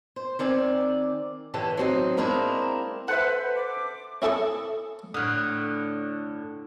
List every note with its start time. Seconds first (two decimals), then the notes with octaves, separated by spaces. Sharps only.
0.16 C5
0.39 D#3 C4 D5 G#5
1.54 D3 E3 G4 A4 C#5
1.77 F#3 C4 D#4
2.17 G#3 A#3 C4 D4 E4 A#4
3.08 A4 B4 C5 E5 F#5
3.56 D6
4.22 C#4 E4 A4 A5 C#6 D#6
5.14 A2 D3 D#6 F6 F#6